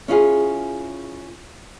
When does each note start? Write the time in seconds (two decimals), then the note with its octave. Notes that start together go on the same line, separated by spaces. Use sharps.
0.08 C#4 E4 F4 G#4